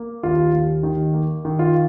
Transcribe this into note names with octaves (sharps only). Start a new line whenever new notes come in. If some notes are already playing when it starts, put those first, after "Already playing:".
Already playing: A#3
D#2 F4
D#2
D#3
A#3
D#3
F4